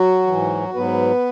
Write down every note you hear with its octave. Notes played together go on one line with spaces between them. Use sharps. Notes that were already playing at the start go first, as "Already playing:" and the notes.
Already playing: F#3 F#4
G#2 E3
G#2 F#3 B3 B4